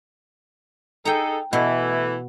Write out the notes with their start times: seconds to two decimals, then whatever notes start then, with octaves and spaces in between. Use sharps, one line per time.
1.05 D#4 G#4 A4 G5 A#5
1.53 B2 E3 A3